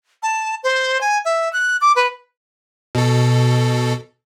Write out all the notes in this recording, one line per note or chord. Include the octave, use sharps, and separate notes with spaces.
A5
C5
G#5
E5
F#6
D6
B4
B2 A4